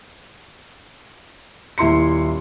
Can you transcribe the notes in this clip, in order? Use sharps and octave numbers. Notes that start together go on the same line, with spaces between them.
D#1 E4 C6 C#7